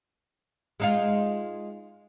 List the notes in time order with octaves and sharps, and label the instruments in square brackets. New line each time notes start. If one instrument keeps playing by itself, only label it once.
[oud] G#3 D#4 F4